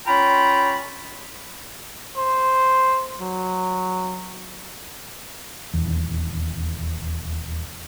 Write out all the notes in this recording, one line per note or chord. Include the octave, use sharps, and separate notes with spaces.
C#4 F4 G5 A#5 B5
C5
F#3
D#1 E2